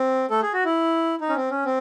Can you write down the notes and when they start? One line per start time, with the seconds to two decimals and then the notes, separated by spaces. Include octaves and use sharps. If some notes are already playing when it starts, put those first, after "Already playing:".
Already playing: C4
0.30 A3 A4
0.42 G#4
0.53 F#4
0.65 E4
1.21 D#4
1.29 C#4
1.36 C4
1.51 C#4
1.65 C4